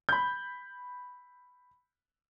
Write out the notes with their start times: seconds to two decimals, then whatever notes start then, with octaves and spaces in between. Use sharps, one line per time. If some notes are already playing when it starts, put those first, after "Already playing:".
0.09 B5 G6